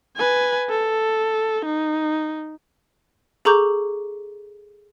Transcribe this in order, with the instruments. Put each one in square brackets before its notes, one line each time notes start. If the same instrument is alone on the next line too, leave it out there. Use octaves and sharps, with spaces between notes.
[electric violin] B4 G#5
A4
D#4
[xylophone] G#4 A4 A#5 C#6 D6 G6